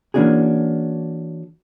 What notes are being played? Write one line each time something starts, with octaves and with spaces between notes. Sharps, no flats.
E3 A#3 C#4 D4 F#4 G#4